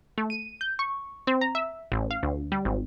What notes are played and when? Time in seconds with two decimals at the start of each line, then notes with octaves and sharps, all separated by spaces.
0.18 A3
0.30 D#7
0.61 G6
0.79 C#6
1.27 C4
1.41 A#5
1.55 E5
1.92 A1
2.11 F5
2.23 D2
2.52 G3
2.65 G#1